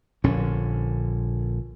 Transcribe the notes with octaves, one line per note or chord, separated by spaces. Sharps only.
A#1 D3 C#4